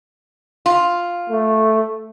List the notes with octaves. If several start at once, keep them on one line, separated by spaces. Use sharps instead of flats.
F4
A3